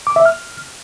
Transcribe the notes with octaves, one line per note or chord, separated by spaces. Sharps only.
D6
E5
F6